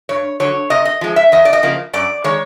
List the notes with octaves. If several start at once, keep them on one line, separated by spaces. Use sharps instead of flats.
G2 C#5
D3 F#3 C#5
C3 D#5
D#5
F3 G#3
E5
E2 D#5
D5
D#5
C#3 F3 A#3
F#2 D5
D#3 G#3 C#5